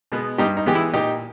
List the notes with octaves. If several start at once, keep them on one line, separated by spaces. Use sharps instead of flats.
B2 G#3 B3
G2 D#4 G4
D#4
E3 G#3 B3 G4
E4
A#2 D#4 G4